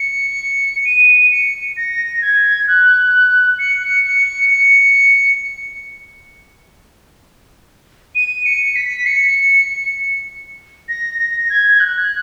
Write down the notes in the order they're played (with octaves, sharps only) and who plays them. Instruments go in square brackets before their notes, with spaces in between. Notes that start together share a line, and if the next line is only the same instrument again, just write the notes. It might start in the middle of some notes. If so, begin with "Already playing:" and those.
Already playing: [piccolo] C#7
D#7
C#7
A#6
G#6
F#6
C#7
C#7
C#7
D#7
C#7
B6
C#7
A#6
A#6
G#6
G#6
F#6